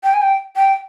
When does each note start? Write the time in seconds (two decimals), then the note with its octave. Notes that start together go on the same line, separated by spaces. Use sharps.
0.04 G5
0.14 G#5
0.22 G5
0.56 G5